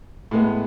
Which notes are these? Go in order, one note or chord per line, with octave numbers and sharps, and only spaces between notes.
A2 G#3 B3